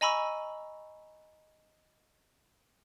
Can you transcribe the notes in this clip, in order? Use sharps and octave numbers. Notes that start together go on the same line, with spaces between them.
D#5 G#5 A#5 B5 C#6 E6